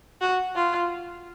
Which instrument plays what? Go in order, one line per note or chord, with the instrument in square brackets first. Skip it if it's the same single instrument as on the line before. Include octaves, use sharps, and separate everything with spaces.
[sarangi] F#4
F4